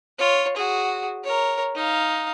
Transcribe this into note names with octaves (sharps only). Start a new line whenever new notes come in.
F4 C#5
F#4 G#4
A#4 C#5
D#4 F5